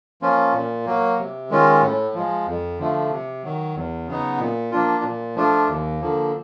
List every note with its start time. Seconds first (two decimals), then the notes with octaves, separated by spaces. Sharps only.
0.22 F3 A#3 C#4 F4
0.54 A#2
0.86 F#3 A#3
1.18 C3
1.50 D#3 G#3 C#4 F4
1.82 A2
2.15 F3 G#3
2.47 F2
2.79 D3 F3 A3
3.11 C3
3.43 D#3 F#3
3.76 E2
4.07 C#3 F#3 B3 D#4
4.39 A#2
4.71 F3 A#3 D4 F4
5.03 A#2
5.35 F3 A3 D4 F4
5.68 D#2
6.00 D3 F3 A#3